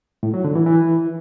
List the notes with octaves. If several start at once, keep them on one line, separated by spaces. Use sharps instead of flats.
A2
F#3
D3
E3
E3